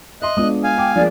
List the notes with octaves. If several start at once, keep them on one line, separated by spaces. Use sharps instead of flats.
D#5 E5 C6 F#6
G#3 B3 D4 F4 D#6
F5 G#5
G5 D6
F3 A#3 G#4 D5